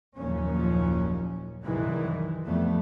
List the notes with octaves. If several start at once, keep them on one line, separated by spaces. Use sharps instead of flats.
F#1 D#2 A#2 F3 C#4
C2 F#2 D#3 E3 G#3
F2 G3 A3 B3